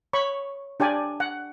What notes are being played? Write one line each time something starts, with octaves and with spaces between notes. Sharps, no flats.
C#5 B5 C#6
D4 G4 D5 G#5
F#5